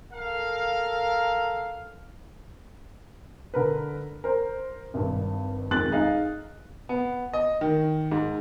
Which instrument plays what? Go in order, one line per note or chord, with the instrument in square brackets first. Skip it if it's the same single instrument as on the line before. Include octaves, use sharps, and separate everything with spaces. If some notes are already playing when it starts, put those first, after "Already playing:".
[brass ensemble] A4 A#4 F5
[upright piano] D3 A#4 B4
A#4 C5
G#1 G2
F2 D#3 G#3 F#6 A6 F#7
D#4 G#4 D#5 F5
[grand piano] B3
D#5
D#3
G#2